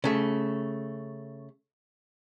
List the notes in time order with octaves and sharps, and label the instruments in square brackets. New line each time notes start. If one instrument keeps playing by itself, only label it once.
[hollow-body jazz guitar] C#3 A3